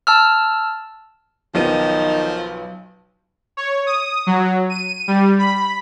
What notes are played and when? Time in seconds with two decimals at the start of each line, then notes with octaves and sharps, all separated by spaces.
0.07 A5 E6 F6
1.55 B1 D#3 F3 B3 D#7
3.57 C#5
3.86 D#6
4.27 F#3
4.70 D#7
5.08 G3
5.39 B5